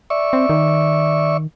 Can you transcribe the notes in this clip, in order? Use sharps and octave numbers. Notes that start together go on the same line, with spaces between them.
D5 E5 C#6
C4
D#3